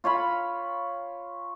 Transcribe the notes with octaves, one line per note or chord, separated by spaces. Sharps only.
F4 C#5 F5 B5